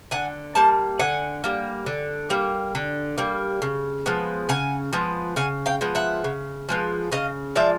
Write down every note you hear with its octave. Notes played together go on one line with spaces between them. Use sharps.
D3 F#5 G#5
G3 A#3 A5
D3 F#5 G#5
G3 A#3
D3
G3 A#3
D3
G3 A#3
C#3
F3 G#3 B3
C#3 F#5 G#5
F3 G#3 B3
C#3 F#5 G#5
F5 G5
F3 G#3 B3
E5 F#5
C#3
F3 G#3 B3
C#3 D#5 F5
F3 G#3 D5 E5